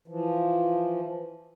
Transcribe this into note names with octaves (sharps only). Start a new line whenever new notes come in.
E3 F3